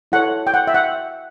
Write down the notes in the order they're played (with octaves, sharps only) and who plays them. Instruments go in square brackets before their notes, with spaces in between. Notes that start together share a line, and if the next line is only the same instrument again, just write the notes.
[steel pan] E4 A4 C#5 F#5
G5
F#5
E5
F#5